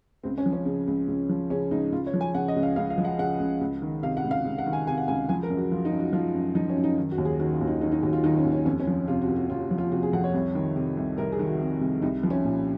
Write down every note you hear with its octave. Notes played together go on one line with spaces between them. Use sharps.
C#2 C4
C#4
F3
C#4
C#3
C#2
C#2
F3
C#3 C#4
C#2 D#4
C#2 F4
C#5
F3
G#5
C#3 F#5
D#5
C#2
F5
C#2 F5
F5
F3
F#5
C#3 F#5
C#2
C#2
D#3
C3 F5
F#5
C#2
F5
C#2
F#5
D#3
G#5
C3 G#5
F#5
C#2 G#5
F3 G#5
A#4
F#2
F#4
F3 F4
D#4
F#2
F#4
F3 F4
F#2
F3 D#4
C#4
F#2
D#4
D#3
F#4
D#2
G#4
D#3 F#4
F4
D#2
D#4
D#3 D#4
D#4
D#2 F#4
F4
D#3 D#4
C#4
D#2
C#4
F2 C#4
C#4
F3
C3 F4
F#4
F2
F#4
F2 F4
F3
F4
C3 F#4
G#4
F2 F#5
C#5
C2
D#3
C3
C2
C2 A#4
G#4
D#3
F#4
C3
C2
C2 D#4
F3
C#4
A#2